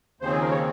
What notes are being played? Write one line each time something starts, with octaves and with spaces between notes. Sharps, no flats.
D#2 C#3 F3 C4 C5
G#4
A#4
C#5